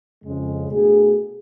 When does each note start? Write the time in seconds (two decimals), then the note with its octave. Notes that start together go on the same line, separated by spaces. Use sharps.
0.24 F2 C#3 G#3
0.70 B2 A3 D4 G#4